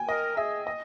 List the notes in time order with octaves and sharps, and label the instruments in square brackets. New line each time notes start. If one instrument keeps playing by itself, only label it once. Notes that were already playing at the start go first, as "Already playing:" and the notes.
Already playing: [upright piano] G5 G#5
[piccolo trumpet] A#4 [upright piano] D#5
[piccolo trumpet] G#4 [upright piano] E5
[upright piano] D#5